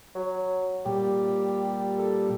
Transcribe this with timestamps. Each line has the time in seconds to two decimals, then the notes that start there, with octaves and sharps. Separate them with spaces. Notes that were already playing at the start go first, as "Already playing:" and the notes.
0.15 F#3
0.86 A#2 G3 G4
1.99 A4